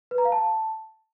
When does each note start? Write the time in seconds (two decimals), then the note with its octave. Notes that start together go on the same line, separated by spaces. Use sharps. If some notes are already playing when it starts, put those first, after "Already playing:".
0.11 B4
0.18 A#5
0.25 F5
0.32 A5